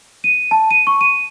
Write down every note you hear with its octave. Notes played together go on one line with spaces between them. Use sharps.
D#7
A5
D#7
C#6
D#7